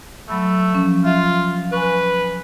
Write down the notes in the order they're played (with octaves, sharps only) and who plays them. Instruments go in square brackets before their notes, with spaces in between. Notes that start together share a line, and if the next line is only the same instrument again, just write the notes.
[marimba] F#3 B5 E6 [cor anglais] A3
[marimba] F3 C#4
[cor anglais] F4 [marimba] E5
[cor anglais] B4 [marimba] G#5 C#6